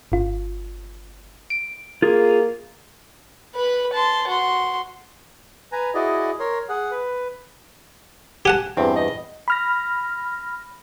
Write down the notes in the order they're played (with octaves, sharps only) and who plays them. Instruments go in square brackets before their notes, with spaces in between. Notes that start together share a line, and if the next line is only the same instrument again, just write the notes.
[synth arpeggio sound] G1 F4
D7
[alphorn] A#3 [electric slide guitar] F4 G#4
[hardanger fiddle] B4 B5
A5 C6
F#4 C6
[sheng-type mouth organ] B4 G#5 A#5
E4 F#4 G#4 D5 D#5
A#4 C#5 C6
G#4 F#5
B4
[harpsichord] G4 F#5 A5 [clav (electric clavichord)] G#5
[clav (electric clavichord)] E2 G2 [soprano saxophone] C4
[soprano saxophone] D#5
[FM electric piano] B5 F6 A#6